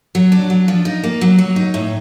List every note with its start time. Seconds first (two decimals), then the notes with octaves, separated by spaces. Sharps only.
0.15 F#3
0.32 D4
0.50 F#3
0.68 F3
0.85 D#4
1.04 A#3
1.21 F#3
1.39 F#3
1.56 D#4
1.74 A2